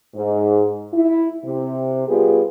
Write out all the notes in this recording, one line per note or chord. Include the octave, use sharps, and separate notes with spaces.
G#2
E4
C3
G3 B3 F4 G4 G#4